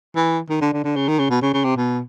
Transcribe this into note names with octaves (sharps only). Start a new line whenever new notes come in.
E3
D#3
D3
D3
D3
C#3
D#3
C#3
B2
C#3
C#3
C3
B2